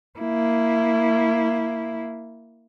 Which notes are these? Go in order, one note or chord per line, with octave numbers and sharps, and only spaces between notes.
A#3 E4